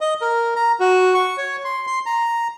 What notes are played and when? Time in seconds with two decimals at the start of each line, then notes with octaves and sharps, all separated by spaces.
0.01 D#5
0.21 A#4
0.56 A#5
0.80 F#4
1.14 C#6
1.37 C#5
1.64 C6
1.87 C6
2.06 A#5